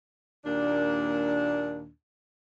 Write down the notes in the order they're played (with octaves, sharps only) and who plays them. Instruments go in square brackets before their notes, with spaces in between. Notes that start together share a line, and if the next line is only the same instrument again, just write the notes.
[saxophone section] D#2 A#2 D4